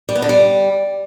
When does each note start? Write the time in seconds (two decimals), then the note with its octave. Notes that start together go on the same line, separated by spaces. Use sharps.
0.09 G3
0.15 B3
0.22 D3
0.29 G3